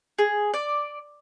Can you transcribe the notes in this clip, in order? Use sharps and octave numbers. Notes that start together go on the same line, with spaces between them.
G#4
D5